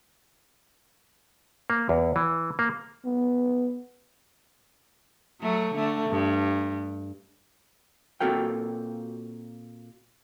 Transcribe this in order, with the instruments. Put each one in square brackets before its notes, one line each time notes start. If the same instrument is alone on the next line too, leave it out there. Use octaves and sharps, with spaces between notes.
[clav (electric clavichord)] A#3
E2
E3
A#3
[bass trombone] B3
[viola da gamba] F#3 A3
D3 A3
G2
[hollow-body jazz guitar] A#2 C4 F#4 A4 A#4 G5